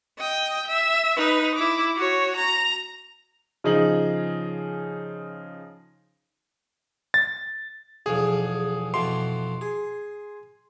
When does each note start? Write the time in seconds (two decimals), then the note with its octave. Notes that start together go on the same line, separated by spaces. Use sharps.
0.18 D#5 G5
0.67 E5
1.17 D#4 B4
1.55 E4 D6
1.96 F#4 C#5
2.37 A#5
3.64 C#3 F3 D#4 G#4 F#7
7.14 A6
8.06 B1 E2 F3 G#4
8.94 F2 B2 E3 C6
9.61 G#4